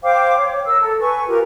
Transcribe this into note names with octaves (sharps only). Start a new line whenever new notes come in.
C5 F5 G5 D6
C#5
A#4 E6
A4
B4 G#5 C#6
F4 G4 A#4